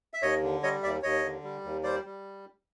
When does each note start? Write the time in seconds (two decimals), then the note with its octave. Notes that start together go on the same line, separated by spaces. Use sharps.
0.14 E5
0.22 D#2 C#5 D#5
0.43 D3
0.63 G3 C#5 D#5
0.83 D#2 D5 E5
1.03 D#2 C#5 D#5
1.23 D3
1.44 G3
1.64 D#2
1.83 G3 C5 D5
2.05 G3